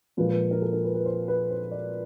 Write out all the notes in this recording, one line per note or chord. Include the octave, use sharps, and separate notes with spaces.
A#2 F3 G#3 B4
B4
A#4
A4
A#4
B4
B4
C5
B4
C5
D5